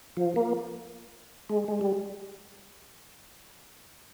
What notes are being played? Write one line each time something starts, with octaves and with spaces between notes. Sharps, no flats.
F3
A#3
G#3
G#3
G3